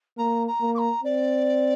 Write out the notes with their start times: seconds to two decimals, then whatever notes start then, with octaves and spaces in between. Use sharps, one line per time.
0.17 A#3 A#5
0.47 A#5
0.61 A#3
0.74 D6
0.78 A#5
1.03 C4 D5